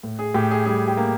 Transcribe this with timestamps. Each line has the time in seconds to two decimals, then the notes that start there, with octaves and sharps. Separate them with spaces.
0.03 A2
0.19 G#4
0.34 A2 G4
0.51 G#4
0.66 G3 G#4
0.88 G4
0.97 A#3